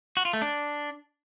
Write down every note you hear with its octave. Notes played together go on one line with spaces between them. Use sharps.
F#4
F4
A3
D4